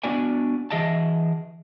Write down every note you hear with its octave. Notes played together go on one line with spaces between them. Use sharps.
B3 D4 F#4 D5 G#5
E3 G#4 D#5 E5 A5